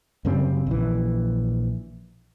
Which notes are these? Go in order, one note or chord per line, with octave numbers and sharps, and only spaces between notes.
F#2 C#3 G3 C4
A#1 E3